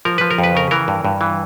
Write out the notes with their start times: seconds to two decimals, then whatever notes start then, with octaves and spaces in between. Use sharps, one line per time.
0.05 F3 A#4
0.18 F3 B4
0.31 A#4
0.38 F2
0.44 B4
0.55 C#3 A#4
0.71 E3 A#4
0.88 G2
1.04 G2
1.21 E3